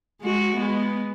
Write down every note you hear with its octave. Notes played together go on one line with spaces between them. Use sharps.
G#3 F#4
G#3 B3